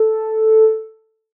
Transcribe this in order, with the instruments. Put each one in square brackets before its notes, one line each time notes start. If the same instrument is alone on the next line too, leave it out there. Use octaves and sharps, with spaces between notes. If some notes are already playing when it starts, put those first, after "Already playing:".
Already playing: [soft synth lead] A4